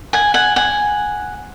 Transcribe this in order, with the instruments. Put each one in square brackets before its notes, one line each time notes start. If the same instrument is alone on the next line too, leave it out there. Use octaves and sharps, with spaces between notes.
[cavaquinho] F#5 G#5
F#5 G#5
F#5 G#5